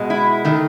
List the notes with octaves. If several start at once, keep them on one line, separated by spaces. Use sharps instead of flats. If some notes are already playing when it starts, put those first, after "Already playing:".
Already playing: B2 G#3
E4
D#3 A3